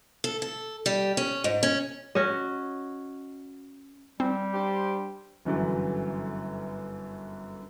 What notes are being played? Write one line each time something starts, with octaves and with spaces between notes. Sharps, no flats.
A4
A4
G3
C#4
G#2
C#4
C#4 F#4 D#5
G3 C4
D4 G4 C5
G1 F#2 D3 E3 F#4